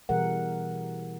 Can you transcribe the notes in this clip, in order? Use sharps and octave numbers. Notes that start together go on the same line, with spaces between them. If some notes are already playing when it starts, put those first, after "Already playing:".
B2 E3 G3 G#4 A#4 F#5